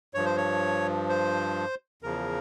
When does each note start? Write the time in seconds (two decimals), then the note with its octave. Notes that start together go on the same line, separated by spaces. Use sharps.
0.14 G2 F3 C#5
0.25 C5
0.37 C#5
1.09 C5
2.02 E2 C#3 F3 A#4